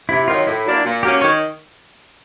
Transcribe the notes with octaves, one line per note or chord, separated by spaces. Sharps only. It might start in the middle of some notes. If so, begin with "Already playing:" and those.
C3 E4
D#3 F#3 F4
A2 E4
F#3 A#3 D4
A#2
F#3 A#3 C#4 G4
D#3 C#5